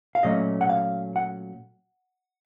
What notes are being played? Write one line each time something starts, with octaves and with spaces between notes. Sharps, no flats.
F5
A#2 F#3 A3 C#4 D#5
F#5
F5
F#5